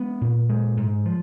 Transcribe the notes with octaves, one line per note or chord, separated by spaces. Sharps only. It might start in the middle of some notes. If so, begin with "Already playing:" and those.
Already playing: G#3 B3
A#2
G#3
G#2
F3